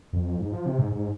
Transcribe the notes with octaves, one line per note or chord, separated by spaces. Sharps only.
F2
G#2
F3
C3
G#2
G#2